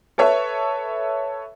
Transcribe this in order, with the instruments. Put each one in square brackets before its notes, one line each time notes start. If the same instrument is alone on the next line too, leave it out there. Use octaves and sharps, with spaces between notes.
[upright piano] A4 B4 C#5 E5